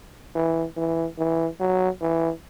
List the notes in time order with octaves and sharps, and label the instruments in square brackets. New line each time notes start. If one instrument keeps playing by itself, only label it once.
[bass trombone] E3
E3
E3
F#3
E3